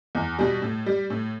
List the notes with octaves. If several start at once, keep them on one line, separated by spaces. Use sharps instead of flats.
E2
B2 G3
A2
G3
A2